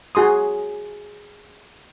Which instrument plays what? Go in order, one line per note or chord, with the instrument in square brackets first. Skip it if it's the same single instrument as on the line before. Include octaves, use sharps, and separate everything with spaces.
[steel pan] F#4 G#4 C6 D#6